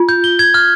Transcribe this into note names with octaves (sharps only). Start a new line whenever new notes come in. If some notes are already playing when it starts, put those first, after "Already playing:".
Already playing: F4
G6
G7
G#6
F6